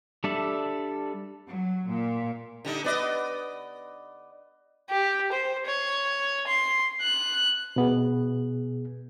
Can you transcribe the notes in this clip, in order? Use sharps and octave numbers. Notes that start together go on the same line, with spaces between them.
G3 D4 A4 D5 E5
F#3
A#2
D3 G3 D#4
B3 D5 D#5
G4
C5
C#5
C6
F#6
B2 B3 G#4